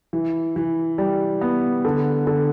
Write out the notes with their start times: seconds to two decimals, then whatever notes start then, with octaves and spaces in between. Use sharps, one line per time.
0.13 E3
0.56 E3
0.98 G3
1.41 B3
1.85 D3
2.27 D3